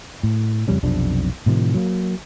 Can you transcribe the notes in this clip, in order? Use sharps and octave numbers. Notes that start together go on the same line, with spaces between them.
A2
F2 C#3 G3 C#4
B1 F2 C3 D4
A2 C3 D#3 F3
F#3 A#3